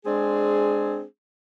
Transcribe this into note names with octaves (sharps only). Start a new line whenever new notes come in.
G#3 C4 D4 G#4